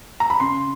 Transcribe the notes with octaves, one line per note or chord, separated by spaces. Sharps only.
A#5
B5
C#3 C6